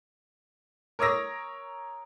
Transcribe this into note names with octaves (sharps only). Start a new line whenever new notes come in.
A#4 C#5 D#6 E6 A#6